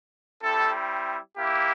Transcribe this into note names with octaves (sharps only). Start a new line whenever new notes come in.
G3 C4 E4 A4
A#3 E4 G4